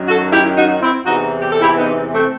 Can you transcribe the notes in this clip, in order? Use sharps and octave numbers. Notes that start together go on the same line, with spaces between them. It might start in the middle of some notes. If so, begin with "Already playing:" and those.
Already playing: F#2 D#3 F#3
F#4 A4
E4 G4
D#4 F#4
C4 E4
E2 C3 E3 D#4 F#4
G4
A4
E4 G4
B3 D#4
A3 C4